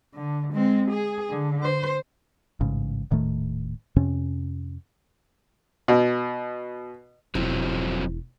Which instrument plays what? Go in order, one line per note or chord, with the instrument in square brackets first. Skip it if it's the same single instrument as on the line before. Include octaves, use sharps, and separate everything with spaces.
[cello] D3
G#3 C4
G#4
D3
C5
[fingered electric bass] A1 G#2 C#3
D#1 A2 D#3 A3
F2 C3 C#4
[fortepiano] B2
[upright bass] E1 E4 [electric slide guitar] F3 F#3 C4